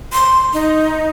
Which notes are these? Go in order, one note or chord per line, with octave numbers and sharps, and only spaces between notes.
C6
D#4